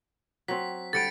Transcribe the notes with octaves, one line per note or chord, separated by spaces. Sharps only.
F#3 C4 B6
D3 G3 A6 C#7 D7